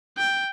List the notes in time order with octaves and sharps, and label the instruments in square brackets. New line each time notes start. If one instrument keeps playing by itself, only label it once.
[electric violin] G5